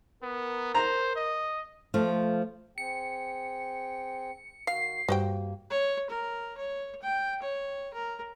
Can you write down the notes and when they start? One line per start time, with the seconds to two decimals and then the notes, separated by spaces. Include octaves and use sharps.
0.23 B3 A#4
0.74 C5 A#5
1.16 D#5
1.94 F3 A3 F4
2.78 C4 G#4 G5 C#7
4.67 D#3 F#4 F5 C7
5.08 G2 A#3 F#4 C5 G5
5.70 C#5
6.10 A#4
6.57 C#5
7.02 G5
7.42 C#5
7.93 A#4